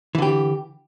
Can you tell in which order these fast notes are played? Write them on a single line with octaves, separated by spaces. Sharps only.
E3 D3 G4